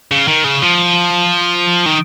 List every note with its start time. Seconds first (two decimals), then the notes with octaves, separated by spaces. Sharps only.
0.11 C#3
0.28 D#3
0.44 C#3
0.62 F3
1.86 D#3